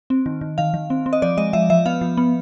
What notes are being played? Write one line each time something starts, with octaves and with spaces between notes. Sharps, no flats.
C4
D#3
D#3
D#3 F5
D#3
C4
C4
D#5
F3 D5
G#3 D#5
F3 E5
F3 E5
B3 F5
F3
B3